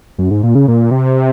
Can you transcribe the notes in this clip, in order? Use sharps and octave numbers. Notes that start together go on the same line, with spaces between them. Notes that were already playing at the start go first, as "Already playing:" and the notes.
F#2
G#2
A#2
C#3
A#2
C3